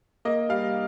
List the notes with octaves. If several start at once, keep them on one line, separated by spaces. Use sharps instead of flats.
A#3 D#5
G3 F5